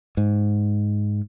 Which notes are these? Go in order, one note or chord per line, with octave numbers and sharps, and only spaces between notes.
G#2